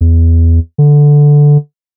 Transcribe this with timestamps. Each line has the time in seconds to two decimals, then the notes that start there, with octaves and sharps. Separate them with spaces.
0.01 E2
0.78 D3